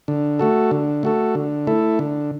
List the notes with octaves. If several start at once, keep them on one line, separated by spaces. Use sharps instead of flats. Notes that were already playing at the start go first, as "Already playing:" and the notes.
D3
A3 F#4 A4
D3
A3 F#4 A4
D3
A3 E4 A4
D3